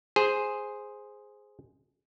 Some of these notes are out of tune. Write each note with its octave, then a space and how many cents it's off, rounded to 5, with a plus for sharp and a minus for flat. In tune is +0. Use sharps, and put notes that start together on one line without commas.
G#4 +0 C5 +0